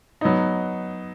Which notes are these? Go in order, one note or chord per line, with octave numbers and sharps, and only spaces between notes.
F#3 B3 D#4